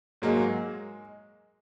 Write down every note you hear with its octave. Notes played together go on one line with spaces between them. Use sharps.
G#2 F#3 G#3 A#3